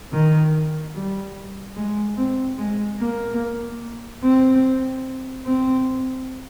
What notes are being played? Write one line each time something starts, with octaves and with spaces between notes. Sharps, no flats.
D#3
G3
G#3
C4
G#3
A#3
C4
C4